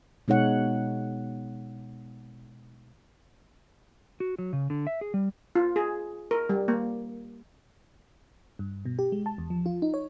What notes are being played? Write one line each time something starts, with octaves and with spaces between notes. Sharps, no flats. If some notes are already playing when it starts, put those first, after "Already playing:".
B2 G#3 D#4 C#5 F#5
F#4
F#3
C#3
D3
E5
G#4
G3
F4
G#4
A#4
G3
A#3
G2
B2
G4
G#3
A5
E2
F3
F4
D#4
C#5